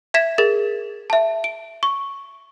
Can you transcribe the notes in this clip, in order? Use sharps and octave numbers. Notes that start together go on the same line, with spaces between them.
E5 G#6 B6 E7
G#4 A#4 A6
E5 A5
D7
C#6